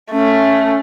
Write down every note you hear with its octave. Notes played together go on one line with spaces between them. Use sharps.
A3 C#4